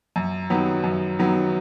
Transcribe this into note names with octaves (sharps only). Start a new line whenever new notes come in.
F#2
D#3 F#3 B3
F#2
D#3 F#3 B3